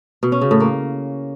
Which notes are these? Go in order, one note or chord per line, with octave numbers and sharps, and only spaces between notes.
B2
C#4
C#3
A2
A#3